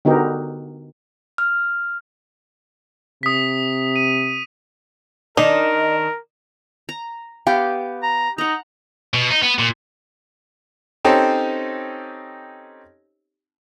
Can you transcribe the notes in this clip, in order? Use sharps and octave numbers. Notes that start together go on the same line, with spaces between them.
D3 B3 D#4 F#4 G4 A#4
F6
C3 D#6 B6
D#7
D#3 D4 D#4 A#4 D#5
A#5
B3 G4 F5 G5
A#5
D#4 F#5 A#5
B2
D#4
B3
A#2
C4 C#4 D#4 G4 A4 C5